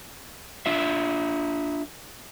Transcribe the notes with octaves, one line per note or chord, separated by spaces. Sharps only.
D4 F4 E5